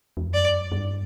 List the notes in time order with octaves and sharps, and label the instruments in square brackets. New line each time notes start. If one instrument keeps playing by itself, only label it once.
[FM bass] E2
F2
[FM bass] F#2 [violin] D5
[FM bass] F#2
G2